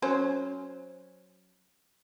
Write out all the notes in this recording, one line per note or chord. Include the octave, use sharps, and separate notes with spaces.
F#3 C#4 C5